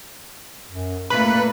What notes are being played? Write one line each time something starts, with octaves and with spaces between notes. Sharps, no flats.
F#2
A#2 A3 A#3 B4